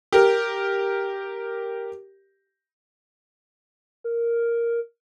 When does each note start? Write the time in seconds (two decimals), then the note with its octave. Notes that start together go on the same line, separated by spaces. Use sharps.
0.13 G4 A#4
4.04 A#4